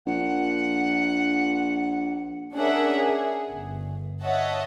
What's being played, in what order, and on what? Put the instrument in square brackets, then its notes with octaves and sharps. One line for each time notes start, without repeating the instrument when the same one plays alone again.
[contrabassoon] A#1 [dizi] F#5
[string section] C#4 D4 G#4 A#4 E5 F#5
G#4
G1
C#5 D#5 E5 F#5 A5